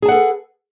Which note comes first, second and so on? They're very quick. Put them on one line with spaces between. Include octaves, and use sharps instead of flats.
G#4 A5 F#5 A4 B4